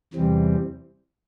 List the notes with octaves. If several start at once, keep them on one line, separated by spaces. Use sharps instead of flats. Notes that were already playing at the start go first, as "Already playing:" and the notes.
E2 C3 E3 G3 C4